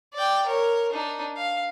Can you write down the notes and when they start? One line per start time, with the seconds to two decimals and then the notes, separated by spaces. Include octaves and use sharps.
0.14 D5 G5
0.46 A#4 C#5
0.92 D4 D#4
1.37 F5